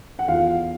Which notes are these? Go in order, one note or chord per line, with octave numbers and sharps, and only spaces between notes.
F#5
E2 F4 F5